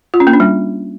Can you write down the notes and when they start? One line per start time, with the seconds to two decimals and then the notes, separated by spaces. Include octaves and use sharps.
0.14 F4
0.20 C#4
0.27 A#3
0.33 D4
0.40 G3